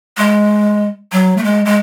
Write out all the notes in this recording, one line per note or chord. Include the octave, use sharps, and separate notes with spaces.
G#3
F#3
A3
G#3
G#3